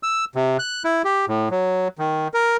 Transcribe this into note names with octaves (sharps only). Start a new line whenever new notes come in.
E6
C3
F#6
E4
G4
A2
F#3
D#3
A#4